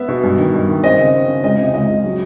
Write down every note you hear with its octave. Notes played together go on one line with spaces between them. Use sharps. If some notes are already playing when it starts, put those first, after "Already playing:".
Already playing: B3 E5
B2
G2
D#3
G2
D#3
C4 D#5
C#3
C4
C#3
C#2 D#5
C3
C#2 D#5
C#2
F#3